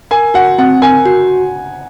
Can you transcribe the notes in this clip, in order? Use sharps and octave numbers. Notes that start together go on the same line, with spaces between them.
A#4 G#5
F#4 F#5
C4 F#5
A#4 G#5
F#4